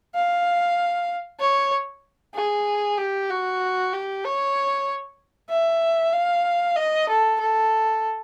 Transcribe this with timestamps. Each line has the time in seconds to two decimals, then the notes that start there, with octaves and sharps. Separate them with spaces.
0.15 F5
1.40 C#5
2.35 G#4
2.98 G4
3.30 F#4
3.93 G4
4.24 C#5
5.50 E5
6.13 F5
6.76 D#5
7.09 A4
7.40 A4